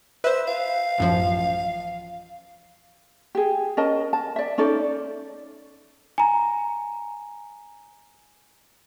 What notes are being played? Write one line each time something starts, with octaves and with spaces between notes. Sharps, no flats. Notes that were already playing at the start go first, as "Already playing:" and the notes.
B4 C5 E5
F5
A1 F#2 F3
G4 G#4
C#4 A#4 D#5 A5
A5
D5 E5
C#4 D#4 A4 D5
G#5 A#5